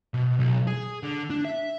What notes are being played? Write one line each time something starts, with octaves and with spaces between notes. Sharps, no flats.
B2
B1
G#4
D3
D4
E5